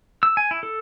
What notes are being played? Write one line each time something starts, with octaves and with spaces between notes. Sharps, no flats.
E6
G#5
E4
A4